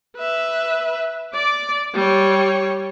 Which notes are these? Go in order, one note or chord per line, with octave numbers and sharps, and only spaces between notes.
B4 E5
D5 D6
G3 C#5